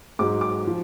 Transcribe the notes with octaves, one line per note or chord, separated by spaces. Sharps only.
G#2 F#3 D6
D6
F3